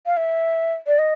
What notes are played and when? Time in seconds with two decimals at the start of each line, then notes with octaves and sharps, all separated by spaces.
0.06 F5
0.17 E5
0.87 D5
0.98 D#5